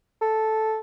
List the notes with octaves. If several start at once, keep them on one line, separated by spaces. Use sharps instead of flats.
A4